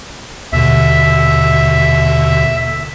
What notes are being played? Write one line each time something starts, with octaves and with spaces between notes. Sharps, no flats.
D#2 B2 D3 E5